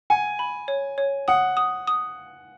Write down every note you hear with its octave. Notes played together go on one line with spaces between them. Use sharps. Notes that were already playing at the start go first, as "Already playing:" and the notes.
F#5 G#5
B5
C#5
C#5
F#5 D#6
D#6
D#6